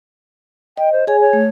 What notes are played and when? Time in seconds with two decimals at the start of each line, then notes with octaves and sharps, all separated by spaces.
0.77 D#5 G5
0.92 C5
1.07 G#4 C#5 G#5
1.20 C#5
1.33 A3